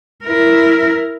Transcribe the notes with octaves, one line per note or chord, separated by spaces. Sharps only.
E4 A#4